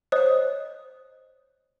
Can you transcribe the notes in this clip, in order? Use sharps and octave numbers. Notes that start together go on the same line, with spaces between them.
C5 C#5 D#5 D#6